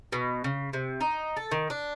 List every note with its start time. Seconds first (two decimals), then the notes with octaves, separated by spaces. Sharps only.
0.12 B2
0.44 C#3
0.73 C3
1.01 D#4
1.37 A4
1.51 D#3
1.70 D4